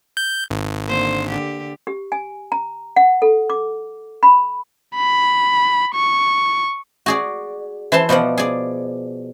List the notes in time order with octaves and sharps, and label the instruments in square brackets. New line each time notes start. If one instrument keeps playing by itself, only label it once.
[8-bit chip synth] G6
G#1
[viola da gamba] D3 A#3 C5
D3 G4
[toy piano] G4
G#5
A#5
F#5
A4
D6
B5
[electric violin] B5
C#6
[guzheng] F#4 G#4 D5
E3 C5 A5 C6
B2 F3 D5 F#5
G#4 D5